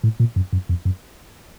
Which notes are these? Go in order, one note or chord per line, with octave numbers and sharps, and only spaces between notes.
A2
A#2
F#2
F#2
F2
F#2